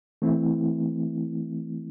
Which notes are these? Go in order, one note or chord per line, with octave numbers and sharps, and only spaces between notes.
E3 A3 C4 E4